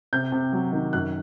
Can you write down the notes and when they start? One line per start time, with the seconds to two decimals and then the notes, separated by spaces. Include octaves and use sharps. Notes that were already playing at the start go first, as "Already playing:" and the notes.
0.13 C3 G6
0.32 C3
0.53 F#3
0.72 D#3
0.93 F#2 F#6